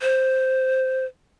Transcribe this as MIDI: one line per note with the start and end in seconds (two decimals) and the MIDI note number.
0.01 1.05 72